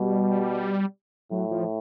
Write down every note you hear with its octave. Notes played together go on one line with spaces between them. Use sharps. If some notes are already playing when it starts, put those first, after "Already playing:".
Already playing: B2 G3
A2 F#3
F3